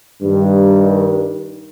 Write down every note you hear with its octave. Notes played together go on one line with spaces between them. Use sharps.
G2 D#3